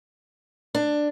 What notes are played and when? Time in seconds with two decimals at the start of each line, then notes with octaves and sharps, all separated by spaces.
0.75 D4